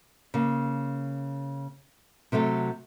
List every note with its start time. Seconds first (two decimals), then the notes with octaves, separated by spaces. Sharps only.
0.34 C#3 A#3
2.32 C3 F#3 A3 A4